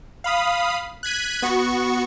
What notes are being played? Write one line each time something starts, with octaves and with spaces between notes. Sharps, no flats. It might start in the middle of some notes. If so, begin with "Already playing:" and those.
F5 B5 D#6
F#6 G#6 B6 D#7
B3 F#4 C#6